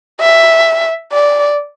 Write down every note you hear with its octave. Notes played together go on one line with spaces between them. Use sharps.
E5
D5